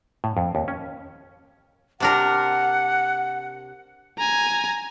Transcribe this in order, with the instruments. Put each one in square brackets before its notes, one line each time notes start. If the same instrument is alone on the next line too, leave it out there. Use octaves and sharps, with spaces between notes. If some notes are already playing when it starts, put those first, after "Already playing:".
[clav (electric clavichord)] A2
F2
D#2
C#4
[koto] C3 D4 A#4 [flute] F#5
[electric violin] G#5 A#5